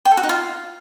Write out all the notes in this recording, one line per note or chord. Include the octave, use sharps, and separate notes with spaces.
G5
A4
F#4
D#4
F4